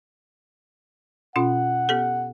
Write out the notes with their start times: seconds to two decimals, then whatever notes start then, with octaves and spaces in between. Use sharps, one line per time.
1.36 B2 C#4 F4 F#5
1.89 B3 G4 A4